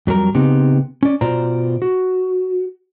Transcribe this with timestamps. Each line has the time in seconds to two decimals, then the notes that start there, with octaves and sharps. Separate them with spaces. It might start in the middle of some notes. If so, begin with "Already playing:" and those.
0.07 F2 F#3 G3 A#4 A#5
0.35 C#3 B3 C4 D#4 G4
1.03 C#4 D5
1.21 B2 F4 C5 D5 A#5
1.82 F#4